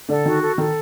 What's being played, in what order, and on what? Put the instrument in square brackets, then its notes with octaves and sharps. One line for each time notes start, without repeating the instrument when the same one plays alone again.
[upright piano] D3 D4 [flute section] A4
[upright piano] D#3 D#4 [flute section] F#4
[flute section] A4
[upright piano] D#3 D#4 [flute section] A4